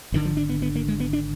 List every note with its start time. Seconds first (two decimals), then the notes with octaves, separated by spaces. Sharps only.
0.12 G#1 F#2 D3 D#3
0.25 F3
0.37 D4
0.49 B3
0.62 B3
0.75 A#3
0.88 G#3
1.00 B3
1.13 D4